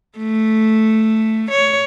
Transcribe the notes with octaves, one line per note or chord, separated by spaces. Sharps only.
A3
C#5